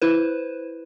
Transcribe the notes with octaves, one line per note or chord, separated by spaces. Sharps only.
E4 B4 C5